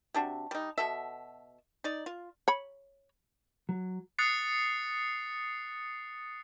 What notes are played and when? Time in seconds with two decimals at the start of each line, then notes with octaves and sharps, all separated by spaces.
0.14 C3 D4 F#4
0.51 G3 D#4
0.78 B2 F#4 A4 E5
1.84 D#4 D5
2.06 F4
2.48 C#5 B5
3.69 F#3
4.19 D#6 F#6 A6 C7 C#7